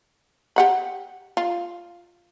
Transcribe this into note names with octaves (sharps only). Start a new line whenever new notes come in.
G4 F#5 B5
F4